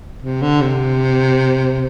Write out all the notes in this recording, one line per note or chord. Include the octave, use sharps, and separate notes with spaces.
C3
D3
C3